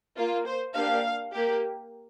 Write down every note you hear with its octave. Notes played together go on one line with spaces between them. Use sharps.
A#3 F4
C5
A#3 D4 G4 F5
A#3 G4